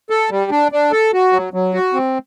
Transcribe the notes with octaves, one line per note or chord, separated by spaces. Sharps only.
A4
G3
D4
D4
A4
F#4
F#3
F#3
F#4
C4